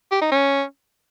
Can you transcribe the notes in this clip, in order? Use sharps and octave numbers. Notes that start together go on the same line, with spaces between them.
G4
D#4
C#4